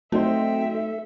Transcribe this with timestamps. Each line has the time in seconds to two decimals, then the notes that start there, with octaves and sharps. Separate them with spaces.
0.12 F#3 A3 C4 D#4 A4 C5 E5 G5
0.75 A4